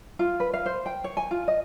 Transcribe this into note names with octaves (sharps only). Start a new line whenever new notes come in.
F4
B4
F5
C5
G5
C#5
G#5
F4
D#5